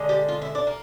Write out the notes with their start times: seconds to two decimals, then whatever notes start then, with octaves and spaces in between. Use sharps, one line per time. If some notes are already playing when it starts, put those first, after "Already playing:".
Already playing: D3 G#3
0.09 G4
0.28 F4
0.42 E4
0.55 D4
0.67 A#3